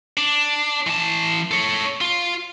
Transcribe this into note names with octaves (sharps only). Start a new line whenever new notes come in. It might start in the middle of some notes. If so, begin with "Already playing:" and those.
D4
E3 A5
A4 C#5
F4